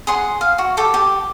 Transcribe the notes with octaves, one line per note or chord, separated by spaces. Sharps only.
G#4 F#5 C6
F5
F#4
G4 A4 G5
G4